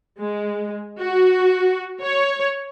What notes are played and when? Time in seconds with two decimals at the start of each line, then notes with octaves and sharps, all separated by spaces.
0.20 G#3
1.01 F#4
2.02 C#5